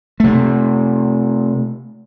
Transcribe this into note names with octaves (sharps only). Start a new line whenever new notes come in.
C3 A3